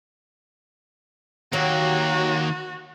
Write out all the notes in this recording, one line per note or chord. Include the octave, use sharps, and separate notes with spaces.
D#2 F#3 A#3 F#4 G4